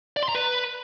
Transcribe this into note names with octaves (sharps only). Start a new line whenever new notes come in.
D5
C6
A#5
B4